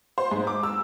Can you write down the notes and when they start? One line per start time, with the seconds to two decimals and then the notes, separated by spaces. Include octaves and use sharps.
0.18 C5
0.31 G#2
0.47 D6
0.63 E6